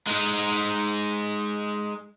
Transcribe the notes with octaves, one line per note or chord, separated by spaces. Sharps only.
G#3 D#4